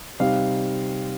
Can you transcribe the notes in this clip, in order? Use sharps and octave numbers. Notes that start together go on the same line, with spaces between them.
C3 G3 C4 D#4 F5